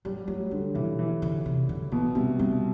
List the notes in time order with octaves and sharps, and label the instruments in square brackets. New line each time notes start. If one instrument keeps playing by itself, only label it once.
[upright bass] F#3 [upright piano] G3
[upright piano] F#3 [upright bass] A3
[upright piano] D3 [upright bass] G3
[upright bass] B2 [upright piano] E3
[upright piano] E3
[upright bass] D3
C3
D3
[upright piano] B2 [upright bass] E3
[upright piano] C3 [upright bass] G3
[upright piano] C3 [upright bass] G3